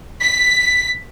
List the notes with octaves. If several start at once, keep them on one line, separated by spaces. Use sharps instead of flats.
B6